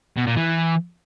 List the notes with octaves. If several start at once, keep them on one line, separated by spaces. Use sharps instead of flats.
B2
A#2
E3